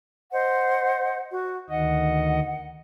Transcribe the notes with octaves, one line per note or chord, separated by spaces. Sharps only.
C5 D#5 F#5
F#4
D2 D#3 D#5 F#5